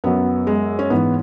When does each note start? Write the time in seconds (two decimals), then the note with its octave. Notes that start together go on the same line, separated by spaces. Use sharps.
0.04 F#2 F#3 B3
0.47 G#3
0.79 C#4
0.90 G#2 E3 B3